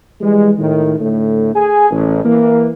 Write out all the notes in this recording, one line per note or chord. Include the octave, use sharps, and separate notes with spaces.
E3 G3 G#3
A2 D#3
A2 D3 A3
G#4 G#5
A1
E3 A#3